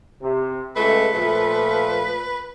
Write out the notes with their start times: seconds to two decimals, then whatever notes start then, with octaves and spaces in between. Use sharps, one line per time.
0.22 C3
0.76 C#2 A3 B4
1.14 A#2 F3 A3